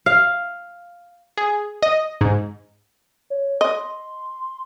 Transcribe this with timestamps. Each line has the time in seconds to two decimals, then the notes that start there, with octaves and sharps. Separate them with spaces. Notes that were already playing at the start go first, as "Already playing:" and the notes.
0.06 F5
1.37 G#4
1.83 D#5
2.21 G#2
3.30 C#5
3.61 D#5 C6